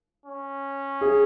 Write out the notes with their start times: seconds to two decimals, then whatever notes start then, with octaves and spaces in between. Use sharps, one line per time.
0.26 C#4
1.01 G#4